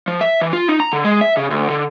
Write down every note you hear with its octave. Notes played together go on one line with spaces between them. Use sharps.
F3
E5
E3
F4
D#4
A#5
D3
G#3
E5
C#3
D2
D3